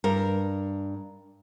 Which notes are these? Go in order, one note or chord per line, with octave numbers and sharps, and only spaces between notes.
G2 A#4